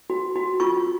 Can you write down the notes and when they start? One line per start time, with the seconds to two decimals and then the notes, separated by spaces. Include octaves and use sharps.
0.10 F#4
0.36 F#4
0.60 F4 C#6